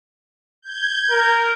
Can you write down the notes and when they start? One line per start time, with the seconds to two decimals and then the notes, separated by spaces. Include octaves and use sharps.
0.61 G6 G#6
1.11 A#4